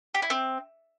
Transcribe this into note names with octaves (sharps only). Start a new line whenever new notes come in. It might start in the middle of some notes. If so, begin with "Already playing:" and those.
G4
E4
C4